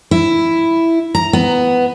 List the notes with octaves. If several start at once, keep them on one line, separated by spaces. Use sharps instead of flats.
E4
A#5
B3